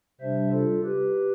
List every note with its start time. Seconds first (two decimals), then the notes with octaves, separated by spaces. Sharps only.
0.21 C3 G3 D4 C5 E5
0.52 F4 A4
0.84 G4 B4